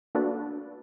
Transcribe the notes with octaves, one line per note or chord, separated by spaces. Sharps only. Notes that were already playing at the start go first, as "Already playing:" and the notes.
A#3 D4 F#4 A4 B4 D5